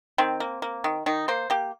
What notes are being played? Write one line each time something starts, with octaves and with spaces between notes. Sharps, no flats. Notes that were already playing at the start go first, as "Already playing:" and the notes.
D#3 C4
A#3
A#3
D#3
D#3 D#4
A#3 C5
A#3 G4